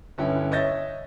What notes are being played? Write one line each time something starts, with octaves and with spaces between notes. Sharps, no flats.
G1 C#4 E4 G5
C#5 D#5 E5 G6 A6 A#6